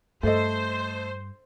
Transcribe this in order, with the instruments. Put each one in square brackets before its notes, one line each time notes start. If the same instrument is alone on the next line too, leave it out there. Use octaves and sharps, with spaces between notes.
[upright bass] G2 [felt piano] A3 A4 D#5 [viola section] C5